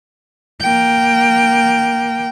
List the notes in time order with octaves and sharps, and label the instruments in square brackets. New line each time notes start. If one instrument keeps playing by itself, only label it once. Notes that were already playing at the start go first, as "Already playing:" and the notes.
[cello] A#3 G5